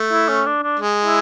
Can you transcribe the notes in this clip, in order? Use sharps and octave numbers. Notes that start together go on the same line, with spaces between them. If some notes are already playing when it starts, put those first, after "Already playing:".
Already playing: A3
E4
C#4
D4
D4
G#3
E4